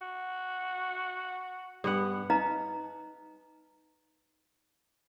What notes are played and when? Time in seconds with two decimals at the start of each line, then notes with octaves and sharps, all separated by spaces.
0.01 F#4
1.84 G2 B3 F#5
2.30 D#4 B4 D#5 F5 A#5